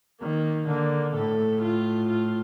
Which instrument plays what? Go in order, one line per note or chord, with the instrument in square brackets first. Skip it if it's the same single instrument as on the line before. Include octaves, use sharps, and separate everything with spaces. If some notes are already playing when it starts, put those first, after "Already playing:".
[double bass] D#3 [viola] A#3
[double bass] D3 [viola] A#3
[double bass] A2 [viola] A4
[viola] F4
F4